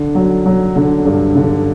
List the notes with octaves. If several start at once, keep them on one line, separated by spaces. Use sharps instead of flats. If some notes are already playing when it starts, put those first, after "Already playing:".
Already playing: D3
F#3
F#3
D3
G2
D3